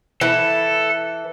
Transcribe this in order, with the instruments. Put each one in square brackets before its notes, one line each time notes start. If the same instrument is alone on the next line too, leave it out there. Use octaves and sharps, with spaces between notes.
[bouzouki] E3 [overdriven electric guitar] A4